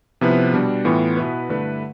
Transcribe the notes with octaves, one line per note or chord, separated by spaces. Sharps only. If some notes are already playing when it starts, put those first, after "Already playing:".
C3 F3 B3 E4 B4
B2 G3 D4
A2 E3 B3 F4
B2 B3 E4 B4
G2 D3 A3 E4 B4